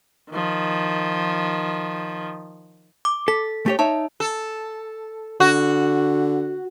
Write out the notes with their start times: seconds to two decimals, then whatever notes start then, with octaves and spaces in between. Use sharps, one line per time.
0.31 D#3 F3
3.05 D6
3.28 A4 B6
3.66 A3 G4 C#5
3.79 D#4 C#5 E5 A5
4.20 A4
5.40 D3 F#4